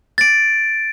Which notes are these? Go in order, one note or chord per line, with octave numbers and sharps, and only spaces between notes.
A6 D7